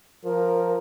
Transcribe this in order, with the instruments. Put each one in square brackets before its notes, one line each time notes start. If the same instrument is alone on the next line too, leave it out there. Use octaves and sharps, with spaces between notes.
[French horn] F3 [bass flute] A#4